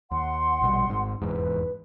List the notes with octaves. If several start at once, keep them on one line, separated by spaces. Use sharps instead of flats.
D#2 F#5 C6
A#1 B2 G3
G#1 G#2
F1 E2 G#2 B4